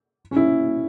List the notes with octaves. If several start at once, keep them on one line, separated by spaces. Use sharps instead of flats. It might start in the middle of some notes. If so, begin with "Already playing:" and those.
C#4
E4